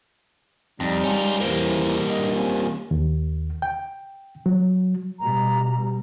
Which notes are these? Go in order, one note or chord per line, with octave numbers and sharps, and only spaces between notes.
F2 G3 D#4
C#4 F4
E2 E3 G3 A#3 C5
G2 A#2 D#5
C4 C#4 F4
D#2
G5
F#3
B2 G3 A#5